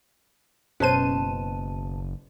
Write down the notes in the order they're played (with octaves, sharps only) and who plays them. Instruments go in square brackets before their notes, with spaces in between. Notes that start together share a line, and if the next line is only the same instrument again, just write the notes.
[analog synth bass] F#1 [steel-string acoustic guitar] B2 A5 [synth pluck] C#4 D#7 [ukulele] B4 C5